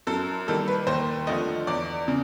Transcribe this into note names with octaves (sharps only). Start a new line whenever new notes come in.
F#2 A4
D#3 G3 A#3 A4
B4
D#2 C5
D3 F3 A3 D#5
E2 D5
C#3